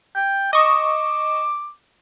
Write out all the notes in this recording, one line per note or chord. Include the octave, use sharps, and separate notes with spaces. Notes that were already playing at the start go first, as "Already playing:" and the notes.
G5
D#5 C#6 D6 E7